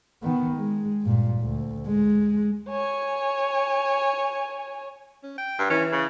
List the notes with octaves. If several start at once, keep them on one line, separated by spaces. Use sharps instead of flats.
D#3 B3
G#3
G2 A#2
D2
G#3
C#5 G#5
C#4
G5
G2
E3 C#4
C#3